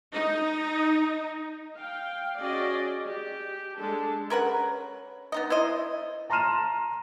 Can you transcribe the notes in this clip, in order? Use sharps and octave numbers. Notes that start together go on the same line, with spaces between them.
D#4
F5 G5
C#4 F#4 G#4 D5 D#5
G4
G#3 D4 A4
C#4 A#4 B4 F#5
B3 D#4 D#5
E4 C5 D#5
A5 A#5 C6 F6 D#7 E7